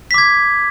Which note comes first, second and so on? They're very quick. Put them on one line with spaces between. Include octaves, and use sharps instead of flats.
B6 D6 G#6